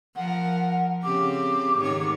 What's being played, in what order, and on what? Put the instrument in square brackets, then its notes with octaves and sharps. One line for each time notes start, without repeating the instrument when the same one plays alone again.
[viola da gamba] F3 A#4 [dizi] F#5
[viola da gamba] C#3 C4 G4 [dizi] D6
[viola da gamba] G#2 D#3 C#5